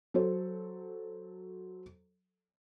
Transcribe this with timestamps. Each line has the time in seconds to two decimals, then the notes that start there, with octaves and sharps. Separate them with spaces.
0.14 F#3 A4 C5